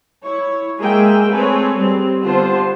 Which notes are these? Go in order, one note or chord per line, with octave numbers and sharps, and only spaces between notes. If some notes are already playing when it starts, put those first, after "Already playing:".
E4 C#5
G#3 A#3 G#4 E5 G5
A3 C4 G#4 A4 B4 C#5
G3 C4
D3 B3 F4 G4 C5 A5